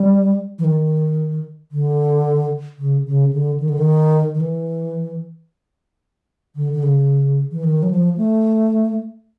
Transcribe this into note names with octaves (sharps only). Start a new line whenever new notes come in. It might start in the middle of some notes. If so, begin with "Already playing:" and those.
Already playing: G3
E3
D#3
D3
C#3
C#3
D3
D#3
D3
D#3
D#3
E3
D3
D3
C#3
E3
D#3
F#3
F3
A3